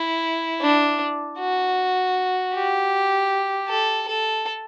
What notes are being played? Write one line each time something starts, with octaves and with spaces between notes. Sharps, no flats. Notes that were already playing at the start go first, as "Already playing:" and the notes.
Already playing: E4
D4
F#4
G4
A4
A4